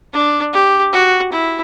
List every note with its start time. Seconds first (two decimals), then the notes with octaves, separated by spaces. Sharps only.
0.13 D4
0.53 G4
0.93 F#4
1.32 E4